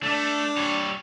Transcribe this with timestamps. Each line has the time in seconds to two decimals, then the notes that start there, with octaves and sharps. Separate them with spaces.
0.03 A3 D4
0.57 G3 C#5